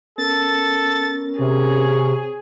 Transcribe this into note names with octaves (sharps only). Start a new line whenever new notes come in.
B3 C#4 A4 A#4 A6
C3 G#4 C#5